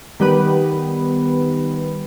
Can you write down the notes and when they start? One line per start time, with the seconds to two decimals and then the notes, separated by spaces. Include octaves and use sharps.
0.20 D#3 G3 B3 B4